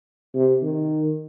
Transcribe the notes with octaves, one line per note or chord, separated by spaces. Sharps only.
C3
D#3